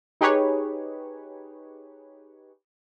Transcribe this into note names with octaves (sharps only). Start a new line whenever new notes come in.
D#4 G4 G#4 B4 C#5